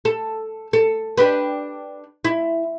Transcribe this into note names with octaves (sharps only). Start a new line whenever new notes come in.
A4
A4
D4 G4 B4
E4